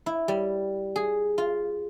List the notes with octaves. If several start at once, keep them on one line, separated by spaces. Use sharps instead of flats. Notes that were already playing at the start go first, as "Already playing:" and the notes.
E4
G3
G#4
F4